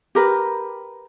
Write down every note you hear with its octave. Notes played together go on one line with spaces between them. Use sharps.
G4 A#4 B4